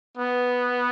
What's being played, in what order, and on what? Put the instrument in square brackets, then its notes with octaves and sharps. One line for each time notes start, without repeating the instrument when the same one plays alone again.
[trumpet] B3